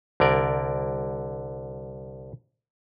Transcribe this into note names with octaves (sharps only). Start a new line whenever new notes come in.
C2 D3 A#4 D5